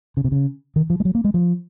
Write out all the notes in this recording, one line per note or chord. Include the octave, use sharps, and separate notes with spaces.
C#3
C3
C#3
D#3
F3
G#3
F#3
A#3
G#3
F3